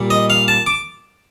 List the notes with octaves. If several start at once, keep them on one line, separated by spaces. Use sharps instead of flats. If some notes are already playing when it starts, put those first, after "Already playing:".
Already playing: A#2 G3
D#5
F5
A5
D6